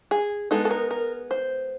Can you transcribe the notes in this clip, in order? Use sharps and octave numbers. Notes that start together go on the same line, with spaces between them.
G#4
G#3 B3 D#4 A4
A4
A#4
A#4
C5